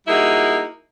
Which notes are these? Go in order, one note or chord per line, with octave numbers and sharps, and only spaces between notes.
G3 A#3 D#4 E4 F#4 G#4